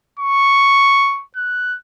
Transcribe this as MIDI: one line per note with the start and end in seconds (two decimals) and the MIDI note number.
0.19 1.23 85
1.36 1.77 90